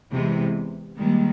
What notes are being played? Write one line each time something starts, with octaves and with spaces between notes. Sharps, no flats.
E2 C3 E3 G#3
D#2 D#3 G3 G#3